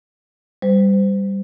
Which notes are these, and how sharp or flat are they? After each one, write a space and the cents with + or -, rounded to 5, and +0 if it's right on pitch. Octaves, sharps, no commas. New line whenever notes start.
G3 +0 C5 -35